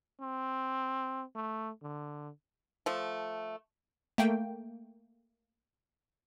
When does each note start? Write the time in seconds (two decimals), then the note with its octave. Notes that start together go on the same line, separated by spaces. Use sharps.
0.21 C4
1.35 A3
1.83 D3
2.86 F3 A3
4.18 A3 A#3 G5